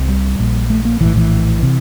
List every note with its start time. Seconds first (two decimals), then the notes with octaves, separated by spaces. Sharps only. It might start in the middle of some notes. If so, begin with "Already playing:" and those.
Already playing: C2 C3
0.09 G3
0.39 A#1 A#2
0.70 A3
0.85 A#3
1.01 A#1 A2 E3
1.17 E3
1.63 C3